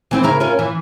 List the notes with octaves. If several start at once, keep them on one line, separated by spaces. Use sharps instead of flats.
E3 C4 E4
C#3 E4 A#4
C#4 F4 A#4
E3